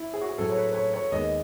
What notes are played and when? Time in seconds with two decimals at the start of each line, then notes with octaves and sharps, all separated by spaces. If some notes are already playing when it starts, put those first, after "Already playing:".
Already playing: E4
0.14 G#4
0.21 F#4
0.29 G#4
0.38 A2 F#3 C#4 A4
0.50 C#5
0.56 B4
0.70 B4
0.74 C#5
0.94 C#5
1.12 D#2 D#3 G#3 B3 D#5